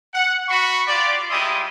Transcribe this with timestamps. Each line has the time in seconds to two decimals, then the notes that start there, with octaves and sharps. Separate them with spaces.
0.14 F#5
0.49 F#4 B5 C#6
0.88 F4 G4 D5
1.30 G3 G#3 E4 C6 D#6